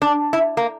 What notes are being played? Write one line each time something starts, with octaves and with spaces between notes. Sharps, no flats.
D4
E4
A#3